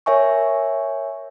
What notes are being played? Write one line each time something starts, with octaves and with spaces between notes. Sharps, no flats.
A#4 C#5 E5 G#5 C#6